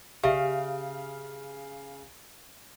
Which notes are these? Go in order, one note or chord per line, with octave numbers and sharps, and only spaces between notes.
C#3 G4 E5 F5